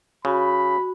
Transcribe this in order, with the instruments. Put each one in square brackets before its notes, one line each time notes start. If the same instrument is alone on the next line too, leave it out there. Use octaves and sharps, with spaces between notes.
[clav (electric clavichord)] C#3 [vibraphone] F#4 [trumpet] B5